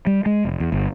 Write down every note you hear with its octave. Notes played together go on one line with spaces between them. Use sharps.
G3
G#3
F1
E2
G1